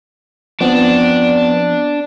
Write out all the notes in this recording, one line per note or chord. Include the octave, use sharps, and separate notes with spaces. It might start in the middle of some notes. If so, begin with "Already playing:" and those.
F3 B3 C4 D4